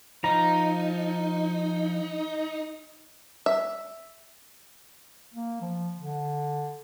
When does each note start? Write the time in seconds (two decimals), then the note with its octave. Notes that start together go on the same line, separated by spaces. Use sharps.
0.24 F3 D#4 A#5
3.46 E5
5.34 A#3
5.61 F3
5.97 D3